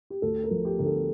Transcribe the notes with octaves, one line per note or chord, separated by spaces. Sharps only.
G4
D2 A4
A#4
F3
G4
D3 A#4
A4